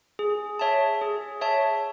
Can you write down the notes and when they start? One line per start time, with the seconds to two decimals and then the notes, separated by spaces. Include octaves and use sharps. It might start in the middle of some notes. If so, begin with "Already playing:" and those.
0.19 G#4
0.59 C#5 E5 A5
1.01 G#4
1.41 C#5 E5 A5